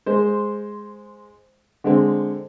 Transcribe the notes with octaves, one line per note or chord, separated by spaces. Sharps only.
G#3 C5
D3 G#3 C4